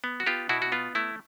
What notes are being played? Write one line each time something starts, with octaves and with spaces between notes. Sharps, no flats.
B3
F#4
B3 F4 G4
B2 E4 F#4
F#4
B3 F4
A3 E4